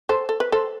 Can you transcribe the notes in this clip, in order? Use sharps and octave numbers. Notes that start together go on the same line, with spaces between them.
A4 C5
A4
B4
A4 C5